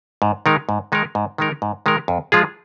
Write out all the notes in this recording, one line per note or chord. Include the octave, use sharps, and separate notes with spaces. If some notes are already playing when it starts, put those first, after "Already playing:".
G#2
D#3 G#3 D#4 A#4
G#2
D#3 G#3 D#4 A#4
G#2
D#3 G#3 D#4 A#4
G#2
D#3 G#3 D#4 A#4
F2
F3 G#3 F4 G#4